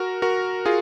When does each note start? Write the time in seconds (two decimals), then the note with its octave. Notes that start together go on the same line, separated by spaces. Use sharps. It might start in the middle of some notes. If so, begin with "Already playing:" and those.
Already playing: F#4 A#4
0.22 F#4 A#4
0.66 F4 G#4